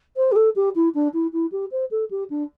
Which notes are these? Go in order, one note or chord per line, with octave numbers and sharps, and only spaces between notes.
C5
G4
A4
G4
E4
D4
E4
E4
G4
C5
A4
G4
D4